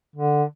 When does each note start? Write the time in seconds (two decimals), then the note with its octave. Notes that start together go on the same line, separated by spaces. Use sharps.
0.16 D3